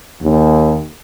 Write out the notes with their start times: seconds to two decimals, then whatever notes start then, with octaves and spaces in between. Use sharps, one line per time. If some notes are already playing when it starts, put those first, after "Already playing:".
0.22 D#2